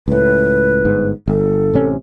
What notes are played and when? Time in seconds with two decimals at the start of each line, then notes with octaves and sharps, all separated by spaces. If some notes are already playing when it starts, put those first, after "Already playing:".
0.08 C#2 A2 B4
0.85 G1 G#2
1.28 G1 A4
1.74 A1 C3 C#4